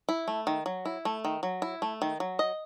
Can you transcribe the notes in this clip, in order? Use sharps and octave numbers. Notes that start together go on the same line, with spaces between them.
E4
A3
D#3
F#3
E4
A3
D#3
F#3
E4
A3
D#3
F#3
D#5